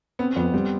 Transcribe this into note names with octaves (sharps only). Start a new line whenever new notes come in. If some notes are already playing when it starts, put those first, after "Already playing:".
B3 C4
F2 B3
G3 C4